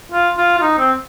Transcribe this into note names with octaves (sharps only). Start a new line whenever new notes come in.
F4
F4
F4
D#4
C4